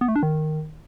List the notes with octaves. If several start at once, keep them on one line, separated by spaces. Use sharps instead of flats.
B3
A3
D4
D#3